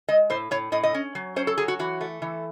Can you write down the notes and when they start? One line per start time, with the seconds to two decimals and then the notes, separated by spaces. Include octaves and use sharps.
0.08 G#3 D#5
0.30 A2 C5
0.51 A2 C#5
0.72 A2 D#5
0.83 D#5
0.94 C#4
1.15 F#3
1.36 C#4 C5
1.47 A4
1.58 F#3 G#4
1.68 F#4
1.79 E3 F#4
2.01 A3
2.22 E3